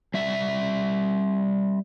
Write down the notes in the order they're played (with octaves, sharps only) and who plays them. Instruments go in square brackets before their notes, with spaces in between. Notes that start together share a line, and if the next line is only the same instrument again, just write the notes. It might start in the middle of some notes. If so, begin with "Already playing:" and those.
[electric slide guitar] G3 E5